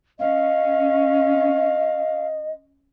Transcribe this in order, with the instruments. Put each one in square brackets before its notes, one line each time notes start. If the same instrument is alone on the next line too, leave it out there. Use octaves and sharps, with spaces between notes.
[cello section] C#4 [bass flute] D#5 [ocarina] F5